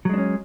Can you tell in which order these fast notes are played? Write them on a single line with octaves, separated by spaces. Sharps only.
F#3 G#3 D4 C#4